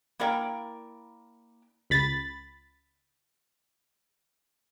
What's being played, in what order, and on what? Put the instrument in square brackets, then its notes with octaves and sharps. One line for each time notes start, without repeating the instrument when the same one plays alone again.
[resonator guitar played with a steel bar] A#3 E4 A#4 D5 G5
[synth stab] C#2 B5 A6